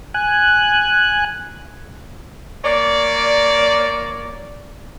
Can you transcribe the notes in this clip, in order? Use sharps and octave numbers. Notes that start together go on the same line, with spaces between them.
G#5 F#6
A#3 C#5 D5